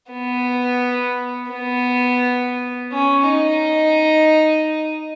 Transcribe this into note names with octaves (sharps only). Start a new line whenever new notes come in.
B3
B3
C#4
D#4